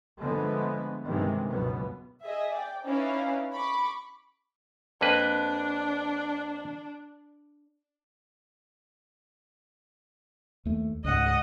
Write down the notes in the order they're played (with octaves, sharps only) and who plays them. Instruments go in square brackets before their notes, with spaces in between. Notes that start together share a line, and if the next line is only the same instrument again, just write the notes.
[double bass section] D3 F3 G#3 A3 B3
G2 C3 D#3 E3 G#3
C#2 F#2 B2 B3
[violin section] G#4 D#5 E5
D5 G5
C#4 D#4 E4 B4 D5 F5
B5 C#6 D6
[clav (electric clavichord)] F2 A#3 B4 [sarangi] D4
[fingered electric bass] D#2 A3
[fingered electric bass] C#2 G#2 [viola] D#5 F#5